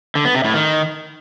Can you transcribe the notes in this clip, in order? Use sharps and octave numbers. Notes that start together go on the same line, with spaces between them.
D3
B3
C3
A2
D#3